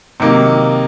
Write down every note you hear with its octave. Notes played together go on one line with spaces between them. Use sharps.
C3 D#3 F#3 A#3 D#4